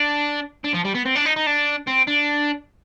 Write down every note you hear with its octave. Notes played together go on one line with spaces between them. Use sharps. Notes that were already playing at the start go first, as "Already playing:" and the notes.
Already playing: D4
D4
F3
G3
B3
C4
D4
D#4
D#4
D4
C4
D4